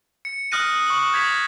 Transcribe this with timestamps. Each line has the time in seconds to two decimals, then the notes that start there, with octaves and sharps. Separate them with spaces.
0.25 C#7
0.52 D#6 F6 F#6 A#6 D#7
0.72 D#6
0.87 C#6 F#7
1.13 G6 G#6 B6 F7